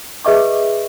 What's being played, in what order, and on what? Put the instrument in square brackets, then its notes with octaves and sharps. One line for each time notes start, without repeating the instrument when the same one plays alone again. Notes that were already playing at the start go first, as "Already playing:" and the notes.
[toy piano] G#4 B4 D#5 E5 C#6 D6